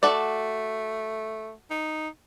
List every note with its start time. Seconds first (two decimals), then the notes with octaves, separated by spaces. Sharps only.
0.03 A3 F#4 A4 D5
1.70 D#4